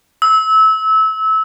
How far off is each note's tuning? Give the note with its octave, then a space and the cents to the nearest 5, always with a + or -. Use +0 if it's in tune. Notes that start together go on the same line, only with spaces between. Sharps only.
E6 -25